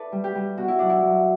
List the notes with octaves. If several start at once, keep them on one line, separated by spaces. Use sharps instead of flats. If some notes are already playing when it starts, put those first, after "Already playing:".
Already playing: D4 E4 A4 B4 D5
G3
G4
G3
B2 F#4
E4
F#3 D4
E4
F#3